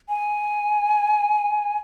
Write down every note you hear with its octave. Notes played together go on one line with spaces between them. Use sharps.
G#5